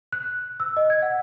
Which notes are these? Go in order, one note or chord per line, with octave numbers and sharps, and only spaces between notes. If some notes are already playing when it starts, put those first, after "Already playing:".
F#6
E6
D#5
G#6
F#5